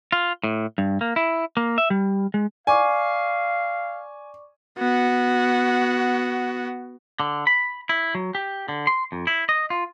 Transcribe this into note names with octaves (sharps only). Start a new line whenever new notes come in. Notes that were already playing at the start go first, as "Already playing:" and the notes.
F4
A2
G2
A#3
E4
A#3
E5
G3
G#3
D5 F5 G#5 C#6 D6
B3 F#4
D3
B5
E4
F#3
G4
D3
C6
F2
E4
D#5
F4